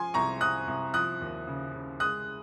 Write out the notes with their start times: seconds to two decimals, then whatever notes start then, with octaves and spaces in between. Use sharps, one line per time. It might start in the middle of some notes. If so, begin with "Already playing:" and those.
Already playing: F3 G#5 C6
0.14 C2 A#5 C#6
0.41 C2 D#6 F#6
0.68 C2
0.94 F3 D#6 F#6
1.20 D#2
1.47 C#3
1.74 C#3
2.00 G#3 D#6 F#6